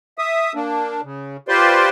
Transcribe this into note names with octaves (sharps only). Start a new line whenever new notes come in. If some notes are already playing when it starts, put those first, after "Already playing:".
E5 D#6
A#3 D4
C#3
F4 G4 B4 C5 D5 C6